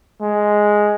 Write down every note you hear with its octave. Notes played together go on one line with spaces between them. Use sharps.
G#3